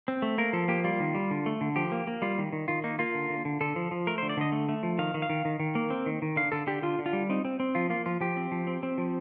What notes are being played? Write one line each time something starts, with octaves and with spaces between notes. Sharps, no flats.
C4
A3
A#3 A#4
F3 A4
A#3 G4
G3 F4
D#3
G3
D3
A3
D3
F3 G4
A#3
A#3
G3 F4
D#3
D#3
D#3 F4
A#3 D#4
A#3 F4
D3
D3
D3
D3 A4
F3
F3
A3 A#4
C5
D3
D5
D3 D#5
A3
A3
F3
D#3 F5
D#3
F5
D#3
D#3
D#3
A#3
C4
D#3
D#3
D3 F5
D3 A4
D3 G4
D3 F4
D3
F4
G3
C4 D#4
C4
C4
F3 F4
A#3 F4
F3 F4
F3 G4
C4
F3
C4
C4
F3